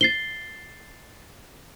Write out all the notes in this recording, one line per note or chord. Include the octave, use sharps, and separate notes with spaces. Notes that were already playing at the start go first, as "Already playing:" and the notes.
A6 C7 G7